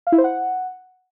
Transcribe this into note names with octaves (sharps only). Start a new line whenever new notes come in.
F5
E4
C5
F#5